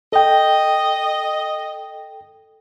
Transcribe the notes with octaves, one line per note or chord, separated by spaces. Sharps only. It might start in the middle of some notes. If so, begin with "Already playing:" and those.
A4 D#5 G5